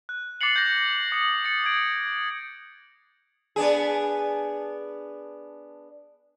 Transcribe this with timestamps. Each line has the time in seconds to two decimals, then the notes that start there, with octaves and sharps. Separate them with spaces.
0.09 F#6
0.41 D6 A6 C7 C#7 F#7
0.56 G6 A#6
1.12 D#6 C#7 F#7
1.44 A6 C#7
1.66 G#6 D7
3.56 B3 D4 G#4